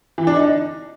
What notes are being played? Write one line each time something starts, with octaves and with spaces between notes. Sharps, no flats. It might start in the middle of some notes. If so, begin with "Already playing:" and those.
E3
D4
D#4